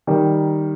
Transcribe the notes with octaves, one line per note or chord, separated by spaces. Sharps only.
D#3 G3